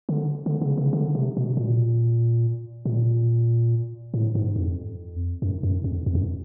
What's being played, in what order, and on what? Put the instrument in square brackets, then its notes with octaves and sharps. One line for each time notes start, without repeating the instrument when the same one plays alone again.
[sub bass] D3
D3
C#3
C#3
D3
C3
B2
A#2
A#2
A2
G#2
F2
F#2
F#2
F2
F2
F#2